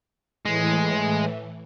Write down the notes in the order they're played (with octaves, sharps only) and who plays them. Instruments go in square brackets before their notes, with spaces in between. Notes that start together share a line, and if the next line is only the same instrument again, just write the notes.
[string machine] A2 E3 [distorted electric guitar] G#3